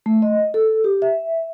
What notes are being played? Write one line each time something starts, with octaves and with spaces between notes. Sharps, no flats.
A3
D#5
A4
G4
E5